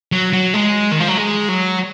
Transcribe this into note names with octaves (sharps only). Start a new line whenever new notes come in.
F#3
F#3
G#3
D#3
F3
F#3
G#3
F#3